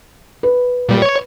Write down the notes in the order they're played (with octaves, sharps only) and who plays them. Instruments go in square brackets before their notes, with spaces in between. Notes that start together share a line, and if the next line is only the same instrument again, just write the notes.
[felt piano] B4
[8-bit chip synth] A#2 G3
C#5